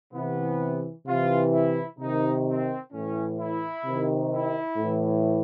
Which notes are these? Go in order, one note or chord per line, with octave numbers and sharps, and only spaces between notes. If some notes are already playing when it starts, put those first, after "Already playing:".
C3 E3 B3
C3 E3 F4
E4
C3 D#3 D#4
C4
A2 E3 C#4
E4
C3 D#3
E4
A2 E3